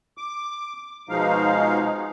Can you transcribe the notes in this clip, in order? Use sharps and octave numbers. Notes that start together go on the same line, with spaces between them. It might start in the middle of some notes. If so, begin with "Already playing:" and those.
D6
B2 F3 G#3 D#4 F5